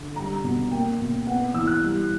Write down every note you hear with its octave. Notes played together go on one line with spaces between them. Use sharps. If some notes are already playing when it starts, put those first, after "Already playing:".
Already playing: D3
G3 A#5
B2
A#3 G5
B2
B3 F#5
E3 E6
F#6
G3